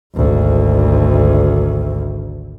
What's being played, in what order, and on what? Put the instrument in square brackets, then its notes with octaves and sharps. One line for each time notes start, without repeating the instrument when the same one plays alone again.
[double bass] G#1 D2